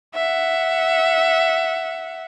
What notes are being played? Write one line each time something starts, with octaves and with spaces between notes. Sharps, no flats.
E5 F#5